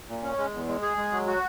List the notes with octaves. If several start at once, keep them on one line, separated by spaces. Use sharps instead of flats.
A#2
C#4
G#3
E2
G#3
G#4
G#3
F#3
F#4